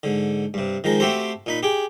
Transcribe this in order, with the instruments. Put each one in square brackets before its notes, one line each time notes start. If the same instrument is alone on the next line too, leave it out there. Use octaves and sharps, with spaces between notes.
[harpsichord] G#2 D3
G2 C3
D#3 F3 G#3 A#4
A3 C4 F#4 G4 A4 C5
A#2 D#4 B5
G4 G#4 G5